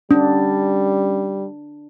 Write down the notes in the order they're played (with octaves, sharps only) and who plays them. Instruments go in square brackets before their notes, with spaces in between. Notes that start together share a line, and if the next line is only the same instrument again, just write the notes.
[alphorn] G3 [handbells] C#4 [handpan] D4